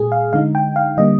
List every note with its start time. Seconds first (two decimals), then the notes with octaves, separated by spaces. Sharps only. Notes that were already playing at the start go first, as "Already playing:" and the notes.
Already playing: A#2 G#3 G#4
0.12 F5
0.33 D3 G#3 D#4 F5
0.55 G5
0.76 F5
0.97 D3 G3 A#3 D#5